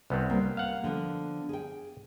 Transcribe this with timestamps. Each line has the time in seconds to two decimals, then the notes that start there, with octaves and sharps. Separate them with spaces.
0.10 C2 B3 C4
0.30 G3 A#3 C#4
0.57 F5 F#5
0.84 D3 F3 B3
1.49 G#4 G5